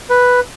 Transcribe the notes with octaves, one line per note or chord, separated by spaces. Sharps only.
B4